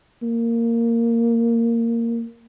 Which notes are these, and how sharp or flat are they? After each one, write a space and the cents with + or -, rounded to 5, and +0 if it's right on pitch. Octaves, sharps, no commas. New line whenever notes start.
A#3 -10